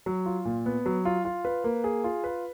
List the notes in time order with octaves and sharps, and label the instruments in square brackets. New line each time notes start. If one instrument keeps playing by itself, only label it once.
[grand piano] F#3
F4
A#2
B3
F#3
F4
F4
B4
A#3
G#4
F4
B4